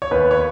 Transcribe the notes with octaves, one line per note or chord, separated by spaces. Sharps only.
C#5
D#2 B4
C#5